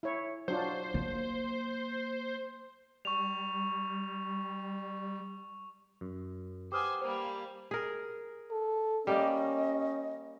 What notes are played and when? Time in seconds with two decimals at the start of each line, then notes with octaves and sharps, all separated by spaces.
0.03 E4 C#5
0.48 F#3 D4 F4 C5
0.94 A#3
3.05 G3 C#6 F7
6.01 F#2
6.72 G4 B4 C5 F#5 G#5 D6 D#6 F6
7.01 G3 A#3 C5
7.71 G#4 A#4
8.51 A4
9.07 G3 A#3 C#4 D5 D#5